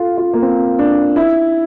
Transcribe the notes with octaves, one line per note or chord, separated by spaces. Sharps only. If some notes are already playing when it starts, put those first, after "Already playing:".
Already playing: F4 A4
F4
A#3
C4
D4
E4